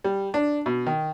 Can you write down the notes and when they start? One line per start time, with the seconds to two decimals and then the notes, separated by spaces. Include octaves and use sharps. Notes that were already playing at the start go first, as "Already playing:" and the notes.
0.04 G3
0.34 D4
0.66 B2
0.87 D#3